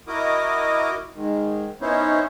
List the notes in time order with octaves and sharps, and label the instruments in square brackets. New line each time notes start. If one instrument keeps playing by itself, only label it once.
[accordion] E4 F#4 A#4 D#5 D6 D#6
G#2 D#3
B3 C#4 D#4 E4 C5 C#5